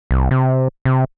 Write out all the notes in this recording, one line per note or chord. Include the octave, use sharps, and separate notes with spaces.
C2
C3
C3